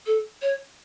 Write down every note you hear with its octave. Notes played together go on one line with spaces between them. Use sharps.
A4
C#5